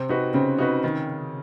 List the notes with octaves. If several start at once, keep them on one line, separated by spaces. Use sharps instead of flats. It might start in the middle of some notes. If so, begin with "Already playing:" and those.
Already playing: C3 C4
D#4 F#4 B4
C#3 C4
D#4 F#4 B4
D#3